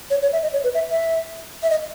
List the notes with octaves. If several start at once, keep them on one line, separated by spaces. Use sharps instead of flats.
C#5
C#5
E5
D#5
C#5
B4
E5
E5
E5
D#5